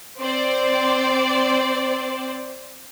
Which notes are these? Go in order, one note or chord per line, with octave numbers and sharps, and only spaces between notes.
C4 C5 D5